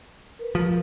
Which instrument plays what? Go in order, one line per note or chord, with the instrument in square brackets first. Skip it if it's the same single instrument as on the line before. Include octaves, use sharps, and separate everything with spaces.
[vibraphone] A#4 B4
[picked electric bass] F3